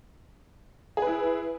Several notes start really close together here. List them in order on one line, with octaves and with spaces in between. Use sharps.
G#4 B4 E4